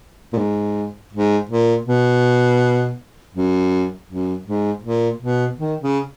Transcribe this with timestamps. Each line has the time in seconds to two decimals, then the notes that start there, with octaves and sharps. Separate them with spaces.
0.33 A#2
0.38 G#2
1.13 G#2
1.49 A#2
1.86 B2
3.34 F#2
4.09 F#2
4.46 G#2
4.83 A#2
5.20 B2
5.58 D#3
5.82 C#3